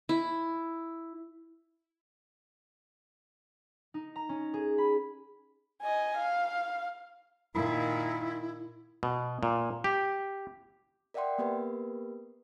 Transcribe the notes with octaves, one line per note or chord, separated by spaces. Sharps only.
E4
D#4
A#5
C#4
G#4
B5
D#5 G#5
F5
A#2 D#3 E4
B2
A#2
G4
A#4 D5 E5 F#5 G5 C6
A#3 B3 G4 A#4 B4